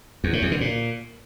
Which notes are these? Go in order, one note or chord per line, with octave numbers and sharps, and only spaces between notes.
E2
A2
E2
D3
A#2